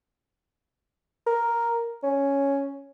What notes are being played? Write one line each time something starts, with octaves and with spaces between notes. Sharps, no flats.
A#4
C#4